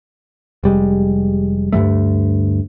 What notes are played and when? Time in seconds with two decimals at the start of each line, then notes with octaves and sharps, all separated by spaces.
0.64 F1 G3 G#3
1.72 D2 G2 G3 A3